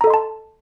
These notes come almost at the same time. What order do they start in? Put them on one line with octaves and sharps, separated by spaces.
A#5 A4 D#5 C6 A5